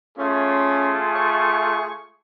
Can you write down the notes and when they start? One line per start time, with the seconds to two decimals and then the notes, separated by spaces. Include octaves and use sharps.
0.18 A3 C#4 F4 G#4
1.15 C#6